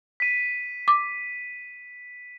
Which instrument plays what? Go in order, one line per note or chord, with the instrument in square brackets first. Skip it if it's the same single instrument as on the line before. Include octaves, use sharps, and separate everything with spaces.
[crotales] B6 D#7
[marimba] D6